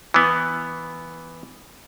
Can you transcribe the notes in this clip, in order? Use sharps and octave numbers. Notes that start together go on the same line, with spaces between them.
E3 B3